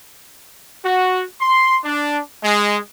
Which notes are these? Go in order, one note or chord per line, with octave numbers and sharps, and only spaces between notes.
F#4
C6
D4
G#3